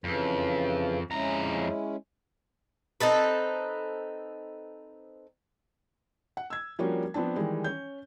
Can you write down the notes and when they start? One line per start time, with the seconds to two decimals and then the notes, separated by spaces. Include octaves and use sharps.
0.04 F2 C#3 E3
1.11 F2 G#3 C#4 E4 A#5
3.00 C4 D#4 A4 B4
6.37 F#5
6.50 E6 G#6
6.79 F3 G3 A#3 C#4 D4 F#4
7.14 F3 B3 C4 D4 A5
7.36 D#3 E3 G3 G#3
7.64 C#4 C#5 G6